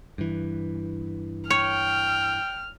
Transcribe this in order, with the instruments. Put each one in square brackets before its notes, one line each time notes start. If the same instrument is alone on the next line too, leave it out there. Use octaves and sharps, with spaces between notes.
[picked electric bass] G2 E3
[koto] C#5 [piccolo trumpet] G5 [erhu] F6